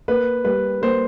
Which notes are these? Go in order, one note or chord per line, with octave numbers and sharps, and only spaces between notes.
A#3 B4
G3 B4
A#3 C5